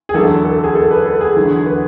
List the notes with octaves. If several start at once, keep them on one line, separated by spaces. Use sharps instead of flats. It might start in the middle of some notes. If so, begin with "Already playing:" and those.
G#4
E2 D3 F#3 A4
A4
G#4
A4
B4
A4
G#4
E2 D3 F#3
B4